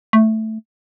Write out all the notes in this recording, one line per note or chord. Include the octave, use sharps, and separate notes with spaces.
A3